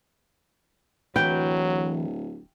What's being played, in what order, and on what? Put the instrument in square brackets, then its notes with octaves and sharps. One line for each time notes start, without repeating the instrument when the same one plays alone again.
[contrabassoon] D1 [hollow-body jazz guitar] E3 B4 [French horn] F#3 [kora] G5